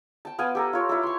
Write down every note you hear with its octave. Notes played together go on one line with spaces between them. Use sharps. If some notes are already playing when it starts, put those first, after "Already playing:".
G5 A5
B3 F5 G5 G#5
G4 A4 A#5
F4 C#5
E4 A4
C6 C#6